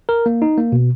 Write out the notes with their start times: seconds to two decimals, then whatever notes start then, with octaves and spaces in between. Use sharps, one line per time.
0.09 A#4
0.26 A#3
0.42 D#4
0.57 A#3
0.72 B2